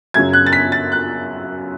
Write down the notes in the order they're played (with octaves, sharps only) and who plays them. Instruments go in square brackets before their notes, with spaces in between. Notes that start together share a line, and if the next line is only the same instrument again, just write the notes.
[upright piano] F#2 C#3 F#3 G#6
F#6
A6
B6
A6
F#6